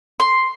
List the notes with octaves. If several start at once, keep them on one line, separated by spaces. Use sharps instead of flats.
C6